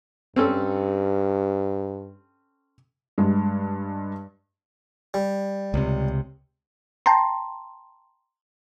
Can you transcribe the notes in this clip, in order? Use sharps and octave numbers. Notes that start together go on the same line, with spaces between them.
G2 C4 C#4 A4
G2 G#3
G3
C#2 C3
G5 A5 A#5 C6